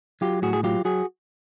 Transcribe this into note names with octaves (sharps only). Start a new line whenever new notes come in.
F#3 F4 G4
A2 F#4 G#4
G#4
F#3 F4 G4
F#3 F#4 G#4